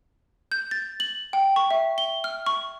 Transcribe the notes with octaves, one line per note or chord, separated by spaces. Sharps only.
G6
A6
F#7
G5
C#6
E5
G7
F6
C#6